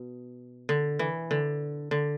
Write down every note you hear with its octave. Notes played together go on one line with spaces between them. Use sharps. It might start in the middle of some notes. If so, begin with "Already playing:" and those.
Already playing: B2
D3
E3
D3
D3